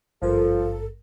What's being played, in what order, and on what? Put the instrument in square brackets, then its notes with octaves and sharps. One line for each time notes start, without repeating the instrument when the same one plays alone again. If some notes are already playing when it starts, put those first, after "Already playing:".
[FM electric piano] G#1 G2 A#4 [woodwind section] F3 [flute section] A4